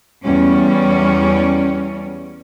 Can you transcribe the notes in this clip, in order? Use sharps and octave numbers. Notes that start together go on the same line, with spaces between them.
E2 G3 C#4